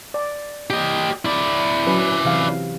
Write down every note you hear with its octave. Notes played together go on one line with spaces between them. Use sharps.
D5
G4 D#5
E4 D5
F#3 C#4 B4
C3 E3 F5